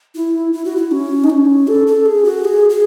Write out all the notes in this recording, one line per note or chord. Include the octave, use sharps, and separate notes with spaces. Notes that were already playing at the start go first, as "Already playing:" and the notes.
E4
E4
F#4
E4
C#4
D#4
C#4
A4
A4
G#4
F#4
G#4
G#4